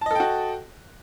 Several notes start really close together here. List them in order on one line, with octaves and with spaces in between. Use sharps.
A5 D#5 A4 G5 F#4